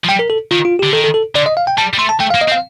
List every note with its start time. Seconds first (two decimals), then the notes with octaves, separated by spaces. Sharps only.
0.04 F3
0.08 G3 G5
0.19 A#4
0.30 A4
0.51 D#3 F4
0.65 F4
0.79 D3 G4
0.93 D#3 A4
1.04 A4
1.14 A4
1.35 D3 D5
1.46 D#5
1.57 F5
1.67 G5
1.78 G3 A5
1.94 G3
1.98 A3 C6
2.09 A5
2.20 A3 G5
2.31 F5
2.35 A#3
2.41 D#5
2.48 C4
2.52 F5